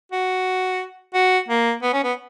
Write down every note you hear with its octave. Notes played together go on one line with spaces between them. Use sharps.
F#4
F#4
A#3
B3
C#4
B3